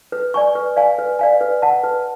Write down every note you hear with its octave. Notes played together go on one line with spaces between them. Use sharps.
B4
D5 G#5 C#6
B4
D5 F5 G#5
B4
D5 F5 G#5
B4
F#5 A5
B4